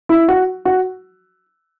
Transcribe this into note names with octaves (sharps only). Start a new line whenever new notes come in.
E4
F#4
F#4